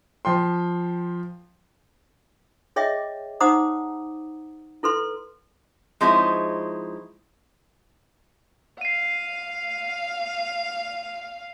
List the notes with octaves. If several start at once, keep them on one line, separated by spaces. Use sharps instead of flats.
F3 G5 C6
G#4 C#5 D#5 E5 G5 D6
D#4 C5 F#5 A#5 D6 D#6
E4 A4 B4 C6
F3 G#3 C4 D#4 E4 C#5
F5 C7 D#7